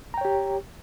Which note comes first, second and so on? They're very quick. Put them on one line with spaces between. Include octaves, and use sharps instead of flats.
A#5 G5 C#5 G4